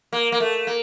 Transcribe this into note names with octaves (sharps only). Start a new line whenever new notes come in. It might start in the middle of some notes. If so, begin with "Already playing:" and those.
A#3
A#3
A3
A#3